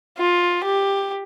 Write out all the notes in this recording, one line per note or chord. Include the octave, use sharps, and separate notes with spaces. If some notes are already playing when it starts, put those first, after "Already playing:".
F4
G4